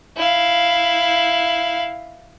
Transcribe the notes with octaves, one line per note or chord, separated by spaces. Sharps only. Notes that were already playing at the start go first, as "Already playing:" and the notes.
E4 F5